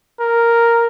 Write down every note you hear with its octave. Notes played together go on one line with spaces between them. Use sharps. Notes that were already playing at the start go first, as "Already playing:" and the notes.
A#4